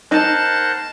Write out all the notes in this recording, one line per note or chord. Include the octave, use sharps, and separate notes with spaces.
D#4 A#4 C5 F#5 A5